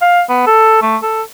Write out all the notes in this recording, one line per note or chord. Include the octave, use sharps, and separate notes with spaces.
F5
B3
A4
A3
A4